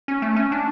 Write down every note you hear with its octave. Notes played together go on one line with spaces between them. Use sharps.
C#4
A3
C#4
D4